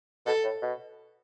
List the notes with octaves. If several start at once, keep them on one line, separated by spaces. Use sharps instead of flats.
B2 A4
A2
B2